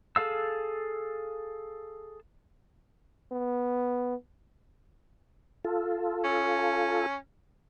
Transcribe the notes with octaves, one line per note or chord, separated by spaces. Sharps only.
G#4 A4 F5 E6
B3
F4 A4
C#4